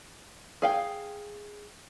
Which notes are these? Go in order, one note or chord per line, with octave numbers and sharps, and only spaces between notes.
G#4 F5 G5